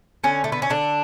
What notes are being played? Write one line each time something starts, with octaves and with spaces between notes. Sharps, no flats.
D3 C#4
A3
B3
C#4
D3 D4